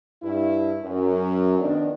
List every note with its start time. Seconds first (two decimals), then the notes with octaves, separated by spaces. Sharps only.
0.23 G2 E4
0.83 F#2
1.59 F2 D#3 B3 D4